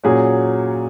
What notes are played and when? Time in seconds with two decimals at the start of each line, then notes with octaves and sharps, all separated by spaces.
0.04 A#2 F#3 C#4 G#4